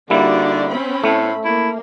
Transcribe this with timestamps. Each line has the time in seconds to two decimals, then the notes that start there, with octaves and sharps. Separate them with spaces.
0.10 D3 G3 A#3 D#4 E4 F#4 D5
0.68 C4 C#4 B5
1.04 A2 A3
1.45 A#3 E4